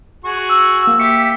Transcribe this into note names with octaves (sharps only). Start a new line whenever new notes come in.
F#4 G#4 C#6
E6
A#3 E6
G4 E5 C#7